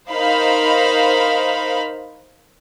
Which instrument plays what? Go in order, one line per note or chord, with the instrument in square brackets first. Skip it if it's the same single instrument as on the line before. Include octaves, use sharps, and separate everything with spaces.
[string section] D#4 A#4 C5 F5 B5